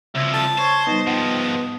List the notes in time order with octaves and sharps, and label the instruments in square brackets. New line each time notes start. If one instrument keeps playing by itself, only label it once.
[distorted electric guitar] C2 F3 [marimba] C#3 G#6 A#6 [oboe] E5
[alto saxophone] A5
[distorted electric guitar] C5 [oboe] C#5
[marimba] G3 D#4 [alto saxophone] B3 [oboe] D#5
[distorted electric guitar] G#2 F3 [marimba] F#5 G5